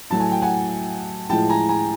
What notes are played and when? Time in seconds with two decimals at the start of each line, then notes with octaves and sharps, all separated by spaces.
0.10 A2 F#3 A3 A5
0.20 G#5
0.32 G5
0.42 F#5 G#5
1.29 A2 F3 G#3 G5 A5
1.49 G#5 A#5
1.69 G#5 A#5